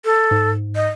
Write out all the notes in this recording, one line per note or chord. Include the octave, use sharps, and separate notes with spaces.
A4
G#2
D#5